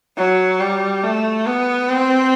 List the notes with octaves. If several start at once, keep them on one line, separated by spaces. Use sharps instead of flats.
F#3
G3
A3
B3
C4